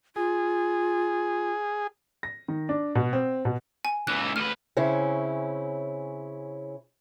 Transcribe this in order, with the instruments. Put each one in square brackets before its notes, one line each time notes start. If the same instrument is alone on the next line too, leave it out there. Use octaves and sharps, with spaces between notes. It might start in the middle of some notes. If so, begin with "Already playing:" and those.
[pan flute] F4 [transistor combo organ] G#4
[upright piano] A#6
D#3
D4
B2
C4
B2
[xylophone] G#5
[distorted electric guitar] C#2 E3 [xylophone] F#6
[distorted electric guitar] D2 B4 [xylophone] F6
[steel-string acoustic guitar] C#3 C4 C#4 E4